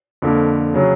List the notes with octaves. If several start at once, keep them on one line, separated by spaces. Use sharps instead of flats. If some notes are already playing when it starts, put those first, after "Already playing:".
F2 D3 F3 A#3
C#3 F#3